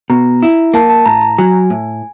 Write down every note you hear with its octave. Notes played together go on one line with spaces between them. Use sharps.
B2 A#5
E4
A#3 A5
A5
A2 A#5
A#5
F#3 G#5
A2